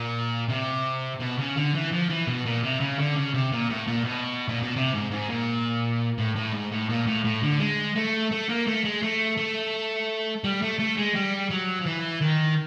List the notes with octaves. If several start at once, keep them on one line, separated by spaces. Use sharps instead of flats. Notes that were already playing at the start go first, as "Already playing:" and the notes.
Already playing: A#2
C3
B2
C#3
D3
E3
F3
E3
B2
A#2
C3
C#3
D3
C#3
C3
A#2
A2
A#2
B2
A#2
B2
C3
G#2
G#2
A#2
A2
A2
G#2
A2
A#2
A2
A2
D3
G#3
A3
A3
A#3
A3
G#3
A3
A3
G3
A3
A3
G#3
G3
F#3
F3
E3
D#3